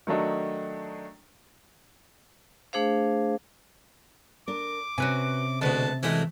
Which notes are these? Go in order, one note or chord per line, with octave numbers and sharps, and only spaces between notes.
D#3 F#3 A3 D4 D#4
A3 D4 G#4 C5 F5
D4 A#4 D6
C3 C#4 F#4 B4 G#5
D2 B2 G#3 B3 A5
F#2 E3 F#3 G#3 A3 G#5